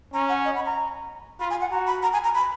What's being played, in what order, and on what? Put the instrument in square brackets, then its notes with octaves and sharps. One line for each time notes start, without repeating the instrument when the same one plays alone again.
[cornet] C#4 [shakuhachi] A#5
[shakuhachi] F#5
D#5
B5
A#5
[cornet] F4 [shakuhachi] B5
[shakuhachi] G#5
F#5
[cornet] F#4 [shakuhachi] A#5
[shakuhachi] B5
A#5
G#5
A#5
B5